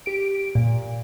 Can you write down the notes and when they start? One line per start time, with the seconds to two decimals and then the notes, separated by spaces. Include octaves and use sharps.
0.06 G4 D7
0.55 A#2